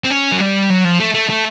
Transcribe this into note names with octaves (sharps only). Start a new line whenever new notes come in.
C4
C#4
F#3
G3
F#3
F3
A3
A3
A3